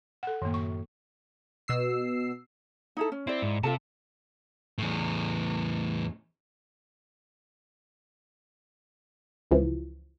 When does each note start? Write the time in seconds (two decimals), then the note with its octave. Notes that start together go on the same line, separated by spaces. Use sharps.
0.23 A4 F#5
0.42 F#2 A2 D#3 A#3
0.54 C#6
1.68 B2 E6 C7
2.97 D#4 E4 A4
3.12 C#4
3.27 C4 E4 D5
3.42 G#2
3.63 C3 F4 A4 A5
4.78 E2 A2
9.51 C#2 E3 F3